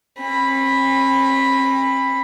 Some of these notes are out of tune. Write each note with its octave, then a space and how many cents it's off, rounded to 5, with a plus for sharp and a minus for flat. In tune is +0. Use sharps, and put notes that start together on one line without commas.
C4 +45 B5 +0